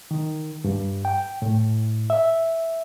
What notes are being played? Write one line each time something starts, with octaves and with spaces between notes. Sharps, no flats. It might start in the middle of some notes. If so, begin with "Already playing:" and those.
D#3
G2
G5
A2
E5